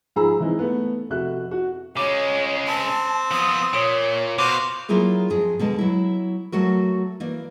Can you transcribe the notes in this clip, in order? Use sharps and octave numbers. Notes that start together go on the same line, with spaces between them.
G#2 F3 G#4 A#5 B5 E6
E3 G#3 C4 D#4 E4
A3 B3
F1 F#4 E5 F#6
F#4
C#3 G#3 C#5 D6
C4 A5
F3 B3 D#6
A#2 C#5 D#6 D7
B2 F#4 C5 F5 D6
F#3 A#3 E4 F4 G#4 A#4
F2 G#4
B2 D3 G#3 A5
F#3 E4
F#3 A3 F#4 A#4
E3 A#3 D5